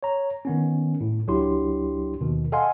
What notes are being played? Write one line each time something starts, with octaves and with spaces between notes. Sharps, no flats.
C#5 A#5
D#3 B3 C#4
A2
C#2 F#3 D4 E4 G4 C6
D#2 B2 D#3
A4 D#5 F5 F#5 G#5 C6